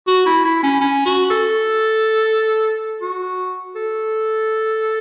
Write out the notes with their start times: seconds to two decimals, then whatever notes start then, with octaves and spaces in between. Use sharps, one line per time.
0.08 F#4
0.26 E4
0.45 E4
0.63 C#4
0.81 C#4
1.06 F#4
1.30 A4
3.02 F#4
3.75 A4